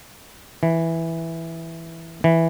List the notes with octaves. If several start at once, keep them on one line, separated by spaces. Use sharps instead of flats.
E3
E3